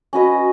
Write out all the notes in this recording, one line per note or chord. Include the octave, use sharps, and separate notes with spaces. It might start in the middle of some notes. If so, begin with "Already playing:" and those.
C#4 F#4 B4 D#5